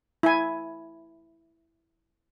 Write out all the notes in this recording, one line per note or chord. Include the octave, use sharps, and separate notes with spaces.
E4 G#5